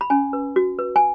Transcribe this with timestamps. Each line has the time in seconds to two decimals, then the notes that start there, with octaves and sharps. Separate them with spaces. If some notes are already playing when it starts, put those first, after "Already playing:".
0.01 B5
0.10 C#4 G#5
0.33 B4
0.56 F#4
0.79 B4
0.96 G#5